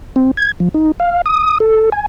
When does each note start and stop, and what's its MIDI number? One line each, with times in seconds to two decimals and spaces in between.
0.16 0.31 60
0.37 0.52 92
0.60 0.69 53
0.74 0.92 63
1.00 1.22 77
1.26 1.58 87
1.60 1.90 69
1.92 2.06 80